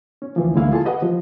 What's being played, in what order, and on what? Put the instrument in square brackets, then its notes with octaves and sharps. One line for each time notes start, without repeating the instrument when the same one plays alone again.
[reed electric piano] C#4
D2 E3 F3
D2 G#3 A#3 E4 F5
F4 G#4 A4 A5
G4 B4 D#5 F#5
F3